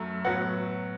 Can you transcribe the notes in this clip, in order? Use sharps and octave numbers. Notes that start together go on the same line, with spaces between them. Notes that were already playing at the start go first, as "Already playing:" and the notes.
Already playing: F#2 F#3 A3
A2 F#3 B3 F#5